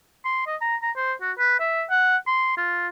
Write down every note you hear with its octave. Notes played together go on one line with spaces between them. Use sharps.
C6
D#5
A#5
A#5
C5
F#4
B4
E5
F#5
C6
F4